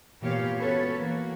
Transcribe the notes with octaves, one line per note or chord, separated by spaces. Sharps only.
A#2 E3 B3 G4 C#5 F5
B3 C#4 F#4 A4 B4 C#5
E3 A#3 F#4